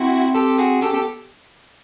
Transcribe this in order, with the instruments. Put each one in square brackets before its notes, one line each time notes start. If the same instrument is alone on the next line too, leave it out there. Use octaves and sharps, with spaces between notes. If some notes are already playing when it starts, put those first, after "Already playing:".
Already playing: [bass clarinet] C4 [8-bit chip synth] E4 F#4
[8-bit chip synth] G4 A4
F#4 G#4
[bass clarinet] C#4 [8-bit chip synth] G4 A4
[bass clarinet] B3 [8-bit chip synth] G4 A4